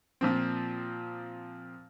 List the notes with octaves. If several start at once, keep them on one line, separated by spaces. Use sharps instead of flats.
A#2 F3 C4